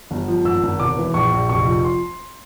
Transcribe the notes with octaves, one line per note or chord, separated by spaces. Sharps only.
G1
F3
G#1 E6
G#1
E1 D6
E3
A#1 C#6
A#1
F1 C#6
F3
C6